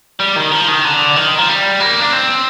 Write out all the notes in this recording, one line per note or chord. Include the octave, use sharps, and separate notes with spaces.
G3
D#3
F3
D#3
D3
D#3
F3
G3
A#3
D4
C4